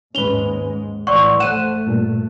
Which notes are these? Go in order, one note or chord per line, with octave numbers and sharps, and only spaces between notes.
D#2 G#2 G#3 C#4 B4 F7 G7
A1 E3 D5 F#5 C6 C#6 E6
A3 C5 F#5 F#6 D#7 E7
G2 A#2